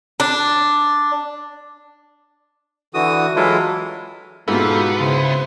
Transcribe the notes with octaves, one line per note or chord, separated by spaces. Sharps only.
D4
D3 E3 F#4 D#6
E3 F#3 G#3 E4 F4 A4
G#2 B2 B3 D4 F4 G4 A4
C#3 E4 C5 C6